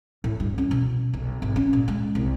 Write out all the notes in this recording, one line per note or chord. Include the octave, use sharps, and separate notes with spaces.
A2
G2
C#4
B2
B1
G#1
C#4
A#2
G#3
C2